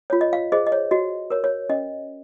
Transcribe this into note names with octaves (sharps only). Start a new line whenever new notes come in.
F4 C#5
D#5
F5
G#4 C5 D#5
D#5
C#5
F#4 D#5
A#4 C#5
C#5
C#4 D#5